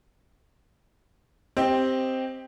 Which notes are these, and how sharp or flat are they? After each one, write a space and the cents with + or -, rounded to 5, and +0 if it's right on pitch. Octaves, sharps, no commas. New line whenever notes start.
C4 +0 G4 +0 D#5 +0